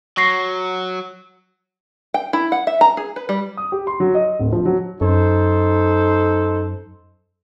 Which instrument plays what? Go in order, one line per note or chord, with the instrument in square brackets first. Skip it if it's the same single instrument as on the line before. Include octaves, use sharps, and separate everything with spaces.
[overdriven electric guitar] F#3 [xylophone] C#6 A#6 C7
[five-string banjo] G5
E4
F#5
E5
A#5
G#4
B4
G3
[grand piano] D#6
G4
C6
F#3
D#5
D1
F3
F#3
[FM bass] F#2 [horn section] D#4 A4 C5